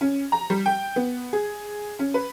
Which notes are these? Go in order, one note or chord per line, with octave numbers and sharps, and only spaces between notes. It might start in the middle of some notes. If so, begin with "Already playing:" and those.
C#4
A#5
G3
G5
B3
G#4
C#4
B4